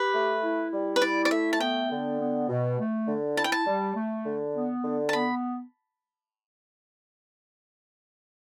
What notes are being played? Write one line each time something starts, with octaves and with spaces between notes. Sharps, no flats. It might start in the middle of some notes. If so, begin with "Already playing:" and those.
Already playing: G4 B4
A3
E4
G3
B4
E4 D5
D5
A3 E5
A5
B3 G5
D3
B3
B2
A3
D3
E4 A5
G5
A5
G3
A3
D3
B3
D3
A5
B3 B5